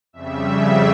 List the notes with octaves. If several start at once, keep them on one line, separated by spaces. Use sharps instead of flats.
F2 C#3 G3 E5